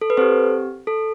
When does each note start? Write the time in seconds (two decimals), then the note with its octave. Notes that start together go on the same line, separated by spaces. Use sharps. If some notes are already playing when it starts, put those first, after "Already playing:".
0.02 A4
0.10 B4
0.17 C4 G4 A4 C5
0.87 A4